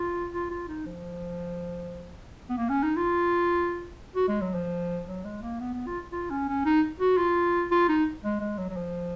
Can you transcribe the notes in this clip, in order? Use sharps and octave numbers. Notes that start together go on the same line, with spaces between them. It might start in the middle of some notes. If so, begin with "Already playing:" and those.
Already playing: F4
F4
F4
D#4
F3
B3
A#3
C#4
D#4
F4
F#4
G#3
F#3
F3
F#3
G#3
A#3
B3
B3
F4
F4
C#4
C#4
D#4
F#4
F4
F4
D#4
G#3
G#3
F#3
F#3
F3